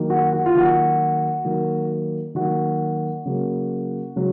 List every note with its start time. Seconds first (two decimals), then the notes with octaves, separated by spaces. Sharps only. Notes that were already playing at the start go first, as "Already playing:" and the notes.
Already playing: D#3 F#3 A#3
0.10 F#4
0.33 F#4
0.46 F4
0.54 D#3 F#3 A#3 F#4
1.45 D#3 F#3 A#3
2.35 D#3 F#3 A#3 F#4
3.25 C#3 F#3 A#3
4.16 C#3 F#3